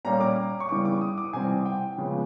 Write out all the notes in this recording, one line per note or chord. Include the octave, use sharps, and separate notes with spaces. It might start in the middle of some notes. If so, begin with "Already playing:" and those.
A#2 G3 A#3 C#4 A#5
D6
C#6
C#3 E3 G3 B3 D6
D6
D#6
D6
C3 E3 G3 C4 G#5
G5
C#3 F3 G#3 B3